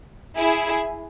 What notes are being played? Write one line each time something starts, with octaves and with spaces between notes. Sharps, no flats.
E4 G#4